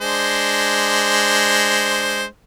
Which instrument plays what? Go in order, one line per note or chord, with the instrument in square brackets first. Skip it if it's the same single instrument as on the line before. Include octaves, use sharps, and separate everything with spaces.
[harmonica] G#3 D4 C5